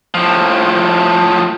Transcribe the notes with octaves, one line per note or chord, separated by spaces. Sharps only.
A2 F3